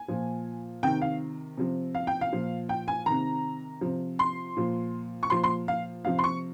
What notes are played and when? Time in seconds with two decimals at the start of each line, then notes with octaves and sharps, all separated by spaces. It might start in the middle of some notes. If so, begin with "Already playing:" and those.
Already playing: G#5
0.08 A#2 F3
0.83 C3 D#3 G5
1.02 F5
1.58 C3 F3
1.95 F5
2.07 G5
2.21 F5
2.32 A#2 F3
2.69 G5
2.88 G#5
3.06 C3 D#3 A#5
3.81 C3 F3
4.19 C6
4.57 A#2 F3
5.23 C#6
5.30 A#2 F3 C6
5.44 C6
5.68 F5
6.05 C3 F3 F5
6.18 C6
6.24 C#6